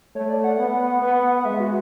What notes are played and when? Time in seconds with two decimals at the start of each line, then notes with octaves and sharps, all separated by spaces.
0.15 A3 C#5
0.30 D5
0.44 F#5
0.58 B3 F#5
1.02 B3
1.39 F#5
1.45 G#3 E5
1.60 F#4